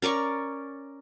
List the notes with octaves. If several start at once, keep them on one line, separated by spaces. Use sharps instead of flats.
C#4 A#4 D5 C#6